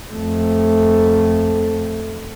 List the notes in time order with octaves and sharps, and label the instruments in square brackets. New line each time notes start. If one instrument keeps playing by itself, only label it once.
[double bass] F2 A3